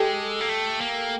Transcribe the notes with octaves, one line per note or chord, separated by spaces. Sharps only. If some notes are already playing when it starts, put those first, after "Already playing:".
Already playing: G#3 G4 A4
A#3
A3
A#3